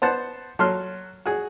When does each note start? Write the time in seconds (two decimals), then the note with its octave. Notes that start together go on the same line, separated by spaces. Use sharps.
0.02 B3 C5 F#5 A5
0.59 F#3 A4 C6 F6
1.25 F#4 G#4